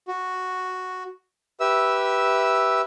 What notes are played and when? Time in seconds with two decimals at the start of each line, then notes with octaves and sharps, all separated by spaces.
0.08 F#4
1.60 G4 B4 E5 E6